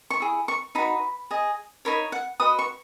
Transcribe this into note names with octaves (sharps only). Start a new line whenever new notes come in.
C#6
E4 G#4
C#6
D#4 F#4 B4 B5
G#4 D#5
D#4 A#4 C#5 B5
F#5
F#4 B4 D#5 D#6
C#6